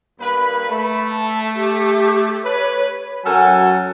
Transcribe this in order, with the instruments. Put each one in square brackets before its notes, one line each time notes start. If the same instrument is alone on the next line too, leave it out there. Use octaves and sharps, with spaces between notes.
[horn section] G2 A#3 B4 [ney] B5
[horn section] A3
[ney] A5
G4
[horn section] B4 [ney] C#5
[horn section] F#2 F#3 A4 A#4 F#5 G#5